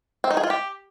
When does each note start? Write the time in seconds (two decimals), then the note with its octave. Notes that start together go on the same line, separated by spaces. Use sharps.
0.24 C4
0.31 D#4
0.37 G#4
0.44 F4
0.50 G4